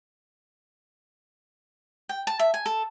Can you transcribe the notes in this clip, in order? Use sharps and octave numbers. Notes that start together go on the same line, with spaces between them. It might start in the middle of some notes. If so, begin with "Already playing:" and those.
G5
A5
E5
G#5
A4